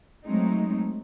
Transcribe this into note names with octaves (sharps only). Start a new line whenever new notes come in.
F#3 G#3 A3 C4 D#4